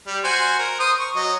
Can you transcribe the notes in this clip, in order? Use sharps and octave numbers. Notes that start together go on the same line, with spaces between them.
G3
F#4 C5 G#5
A#4
C5 D#6
C#6
F#3 D#5